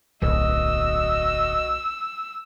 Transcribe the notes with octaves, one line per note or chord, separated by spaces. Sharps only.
D1 B1 F#4 D#5 E6